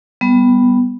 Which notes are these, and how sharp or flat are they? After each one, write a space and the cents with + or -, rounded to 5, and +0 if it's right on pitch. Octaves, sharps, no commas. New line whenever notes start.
G3 +0 B3 +0